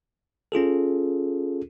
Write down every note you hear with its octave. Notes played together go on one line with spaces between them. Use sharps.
C#4 F4 G#4 A4